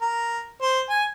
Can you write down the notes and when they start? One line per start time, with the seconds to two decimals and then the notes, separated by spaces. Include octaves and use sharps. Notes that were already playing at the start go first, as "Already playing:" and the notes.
0.01 A#4
0.61 C5
0.89 G#5